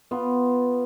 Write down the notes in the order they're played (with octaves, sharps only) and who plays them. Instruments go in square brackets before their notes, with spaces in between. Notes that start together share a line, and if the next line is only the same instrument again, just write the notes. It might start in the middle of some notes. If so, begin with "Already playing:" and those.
[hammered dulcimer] B3 F4